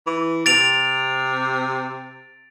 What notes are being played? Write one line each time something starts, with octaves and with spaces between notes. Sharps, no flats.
E3
C3 A6 D7 F7